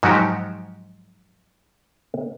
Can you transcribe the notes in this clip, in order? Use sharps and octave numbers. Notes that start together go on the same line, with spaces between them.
G#2 F3 F#3 D#4 F#4 G4